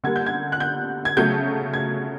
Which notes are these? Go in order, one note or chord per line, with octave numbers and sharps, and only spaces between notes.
D3 G3 A#3 G#6
G6
G#6
F#6
G6
G#6
C#3 F#3 A3 G6
G#6